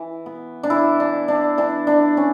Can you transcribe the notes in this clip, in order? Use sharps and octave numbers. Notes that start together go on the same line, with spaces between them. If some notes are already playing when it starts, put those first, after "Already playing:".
Already playing: E3
B3
D4
E3 E4
D4
B3
D4
E3 D4
D4
B3
C#4